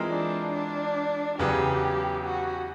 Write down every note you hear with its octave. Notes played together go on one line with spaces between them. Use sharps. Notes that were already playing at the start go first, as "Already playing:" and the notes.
Already playing: E3 G#3 C4 F4 A#4
D4
D4
E2 C#3 F#3 B3 G4
F#4